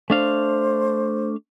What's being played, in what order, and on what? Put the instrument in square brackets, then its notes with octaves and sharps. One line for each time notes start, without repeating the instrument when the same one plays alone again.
[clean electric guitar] A3 D4 F5 [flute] C5